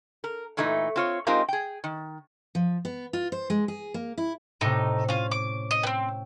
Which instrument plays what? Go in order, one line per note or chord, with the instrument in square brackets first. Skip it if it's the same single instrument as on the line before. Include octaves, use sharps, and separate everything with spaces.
[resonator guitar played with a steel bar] A#4
A#2 E3 A3 D#4
C4 F4 C#5
G#3 C4 D#4 F4 G4 A#4
G#4 G5
D#3
[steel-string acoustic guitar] F3
B3
F4
C5
G#3
G#4
A#3
E4
[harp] A2 C3 [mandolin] A3 D#4
[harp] C#4 [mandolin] F4 F5
[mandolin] D6
D#5
[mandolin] B3 C4 [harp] G5